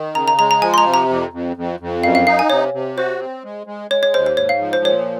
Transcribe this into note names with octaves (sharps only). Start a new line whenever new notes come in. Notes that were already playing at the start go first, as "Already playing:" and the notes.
Already playing: D#3
C#3 A#5
A#5
G#3 A#5
A#5
F3 G#5
C6
A#5
C3
A#5
F2
F2
F2
F2
F#2 F5
F5
D#4 F5
G#5
C3 C#5
C3
F#4 C5
C4
G#3
G#3
G#3 C#5
C#5
D#2 C5
C5
G#2 C#5
F5
F3
C5
A#2 C#5